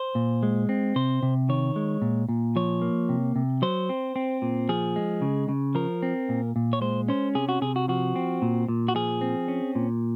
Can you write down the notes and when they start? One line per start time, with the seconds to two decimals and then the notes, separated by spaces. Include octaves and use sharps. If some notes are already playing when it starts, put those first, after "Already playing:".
Already playing: C5
0.15 A#2
0.43 G#3
0.69 C4
0.96 C3 C5
1.23 C3
1.49 D#3 C#5
1.76 G#3
2.02 A#2
2.29 A#2
2.56 F3 C#5
2.82 A#3
3.09 C3
3.36 C3
3.62 F#3 C5
3.89 C4
4.16 C4
4.42 A#2
4.69 F3 G#4
4.96 G#3
5.22 C#3
5.49 C#3
5.75 F3 A#4
6.03 C4
6.29 A#2
6.56 A#2
6.73 C#5
6.81 G#3 C5
7.09 C#4 C5
7.35 C3 G#4
7.49 F#4
7.62 C3 G#4
7.76 F#4
7.88 F3 F#4
8.16 C4
8.42 A#2
8.69 A#2
8.88 F#4
8.95 F3 G#4
9.21 C4
9.48 C#4
9.75 A#2